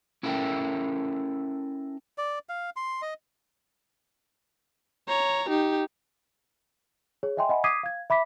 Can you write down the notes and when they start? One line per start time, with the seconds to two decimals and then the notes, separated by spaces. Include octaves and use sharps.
0.23 C#4 E4 A4 A#4 E5 G5
2.18 D5
2.49 F5
2.76 C6
3.02 D#5
5.08 C#5 A#5
5.49 D#4 G4
7.23 G#4 C#5
7.37 D#5 E5 G5 G#5 C6
7.49 D#5 E5 F#5 G#5 B5
7.64 D6 D#6 G#6 B6 C7 D#7
7.83 F5 G#6
8.10 E5 B5 D6 B6